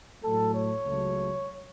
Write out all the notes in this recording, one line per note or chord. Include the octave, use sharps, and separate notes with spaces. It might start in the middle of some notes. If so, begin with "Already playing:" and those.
A2 F#3 A3 A4
C#5
C#2 C#3 F#3 A3